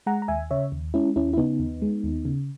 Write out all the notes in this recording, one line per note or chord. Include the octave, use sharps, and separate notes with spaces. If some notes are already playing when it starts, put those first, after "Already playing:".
G#3 F#5 A#5
A#5
D#2 E5 G#5
C#3 C#5 E5
D#2
G#3 C#4 E4
D#2 C#4 E4
E4
C#3 B3 D#4
D#2
G#3
D#2
C#3